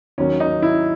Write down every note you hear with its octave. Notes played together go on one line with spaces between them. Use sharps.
D#2 D#3 F#3 C#4
D#4
E4